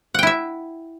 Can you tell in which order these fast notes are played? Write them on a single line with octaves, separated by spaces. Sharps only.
F#5 G5 E4 E5